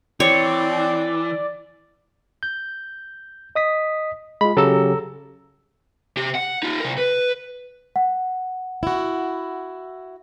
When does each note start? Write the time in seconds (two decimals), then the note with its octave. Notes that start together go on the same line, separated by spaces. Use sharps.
0.20 E3 C4 C#5 D5
2.43 G6
3.56 D#5 D#6 B6
4.41 G#3 F4 B5
4.57 C#3 F#3 G4 A4 A#5 E6
6.17 C3 G4
6.35 F#5
6.63 D#4 F4
6.80 C3 A#4
6.98 B4
7.96 F#5
8.83 E4 F#4